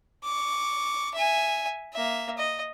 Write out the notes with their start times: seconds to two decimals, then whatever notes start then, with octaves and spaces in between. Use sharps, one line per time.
0.24 C#6 D6
1.14 E5 G#5
1.94 A#3 E5
2.38 D#5